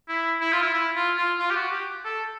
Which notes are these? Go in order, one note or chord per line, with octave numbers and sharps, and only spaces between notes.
E4
E4
F4
E4
E4
F4
F4
F4
G4
F#4
G4
A4